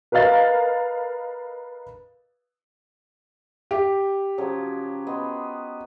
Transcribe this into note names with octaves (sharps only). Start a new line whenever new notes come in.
A#4 B4 D#5 F5 A6
G4
C#3 F3 F#3
B3 D#5 C6